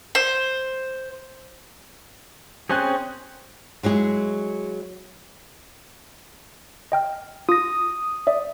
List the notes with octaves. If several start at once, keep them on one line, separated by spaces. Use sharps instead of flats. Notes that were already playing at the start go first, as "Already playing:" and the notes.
C5
C4 C#4 G#4 C5 G#5 F#6
F#3 G#3 E4 G#4
D#5 G5 F6
F4 D#6 A#6
D5 E5